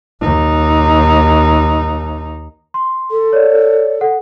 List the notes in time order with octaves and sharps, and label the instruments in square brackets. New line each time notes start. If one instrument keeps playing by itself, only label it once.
[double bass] D#2 D#4
[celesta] C6
[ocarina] A4
[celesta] C#5 D5
A4 F#5